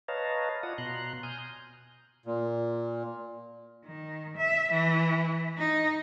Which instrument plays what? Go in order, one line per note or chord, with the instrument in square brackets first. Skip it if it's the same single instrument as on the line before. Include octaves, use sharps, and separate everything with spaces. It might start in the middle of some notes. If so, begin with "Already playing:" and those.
[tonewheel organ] B4 C#5 D#5 F5 A5 A#5
F4 D5 D#5 F#5 D#6
B2 A#5 C6 F#6
G#5 D#6 F6 G6
[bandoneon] A#2
[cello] D#3
E5
E3
D#4